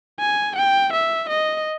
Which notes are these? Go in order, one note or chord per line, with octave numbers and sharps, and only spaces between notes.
G#5
G5
E5
D#5